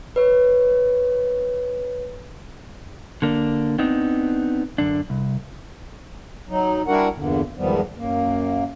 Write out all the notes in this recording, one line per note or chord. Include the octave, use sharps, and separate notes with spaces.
B4 C#5
D3 A#3 D4
B3 C4 D4 D#4
F#2 D3 D4
C2
F#3 D#4
G3 D4 E4 F#4 A#4 F#5
E2 G2 A#2 D3
E2 G#2 D#3 F3 G3 B3
F#2 A#3